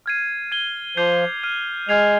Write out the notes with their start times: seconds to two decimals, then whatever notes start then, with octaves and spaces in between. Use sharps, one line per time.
0.06 F6 G#6 C7 D#7
0.52 G#6 D#7 G7
0.97 F3 D6 G6 C7 F7
1.43 F6 C7 D#7
1.89 G#3 F6 G#6 C7 F7